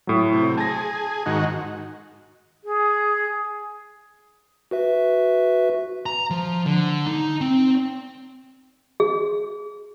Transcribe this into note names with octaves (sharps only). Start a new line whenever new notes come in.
A2 F#3
C3
G#4 A5 A#6
G#2 D#3 F#4
G#4
F#4 B4 E5
A#5
F3
D3
D#4
C4
G#4